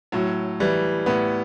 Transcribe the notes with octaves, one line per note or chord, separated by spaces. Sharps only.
A2 F#3
E3 G3
A2 B3